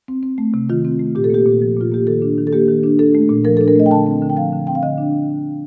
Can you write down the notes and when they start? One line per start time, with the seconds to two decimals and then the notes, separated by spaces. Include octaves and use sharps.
0.08 C4
0.23 C4
0.38 A3
0.54 C3
0.70 D#3 F4
0.85 C4
0.99 A3
1.15 A#2 G4
1.24 A4
1.30 A#3 G4
1.46 A#2
1.62 F3
1.76 A#2 F4
1.92 A#3 G4
2.07 D#3 A4
2.22 D4
2.38 D#3
2.47 A4
2.52 A#3 G4
2.68 D#3
2.83 D4
2.99 D4 A4
3.15 A3
3.29 A#2
3.45 F3 A#4
3.57 A4
3.61 D4
3.68 A#4
3.75 A3 D#5
3.86 G5
3.91 D3 A5
4.07 C4
4.22 D3
4.30 G5
4.37 F3 F5
4.53 D3
4.67 C4 G5
4.75 F5
4.83 D3 D#5
4.98 D4